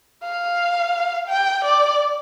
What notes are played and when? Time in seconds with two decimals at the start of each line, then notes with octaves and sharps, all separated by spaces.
0.24 F5
1.28 G5
1.64 D5